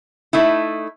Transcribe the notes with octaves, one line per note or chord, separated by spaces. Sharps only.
A3 D#4 E4